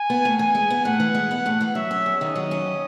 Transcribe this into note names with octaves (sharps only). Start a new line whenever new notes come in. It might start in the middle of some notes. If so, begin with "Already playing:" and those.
Already playing: G#5
B3
A2
E3 G#5
G#3
B3
A2 F#5
E3
G#3
B3
A2
E3
F#3 E5
C#4
E2
D#3 D#5
F#3
C#4